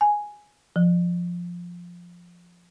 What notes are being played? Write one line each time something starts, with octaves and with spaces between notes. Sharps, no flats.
G#5
F3